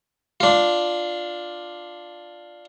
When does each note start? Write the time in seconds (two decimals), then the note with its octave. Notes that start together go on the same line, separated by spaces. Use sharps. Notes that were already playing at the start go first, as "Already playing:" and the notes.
0.40 D4 F4